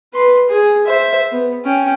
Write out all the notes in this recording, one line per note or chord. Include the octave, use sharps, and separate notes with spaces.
B4 C6
G#4
C5 E5
B3
C#4 G5